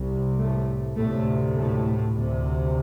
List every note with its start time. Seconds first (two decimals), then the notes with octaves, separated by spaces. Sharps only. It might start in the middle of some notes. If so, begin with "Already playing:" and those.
Already playing: C2 C3
0.38 A2 A3
0.97 D2 A2 C3 A3
1.55 A2 A3
2.15 D2 C3